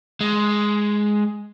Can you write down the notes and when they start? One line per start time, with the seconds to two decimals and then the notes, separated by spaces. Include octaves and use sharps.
0.21 G#3